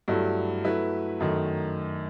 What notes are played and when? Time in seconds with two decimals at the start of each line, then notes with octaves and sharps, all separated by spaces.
0.08 G2 F#3 A3 E4
0.64 F#3 A3 E4 B4
1.20 F#2 D#3 A3